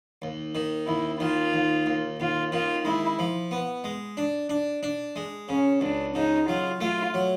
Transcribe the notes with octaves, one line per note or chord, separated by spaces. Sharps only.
D#2
D#3
D#2 E4
D#3 F4
D#2
D#2
D#2 F4
D#3 F4
G#3 E4
F3
B3
G#3
D4
D4
D4
G#3
C#3 C#4
C#2 D4
C#3 D#4
F#3 F4
A3 F4
F#3